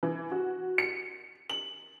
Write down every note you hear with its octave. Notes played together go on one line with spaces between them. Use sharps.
E3
F#4
C#7
F#7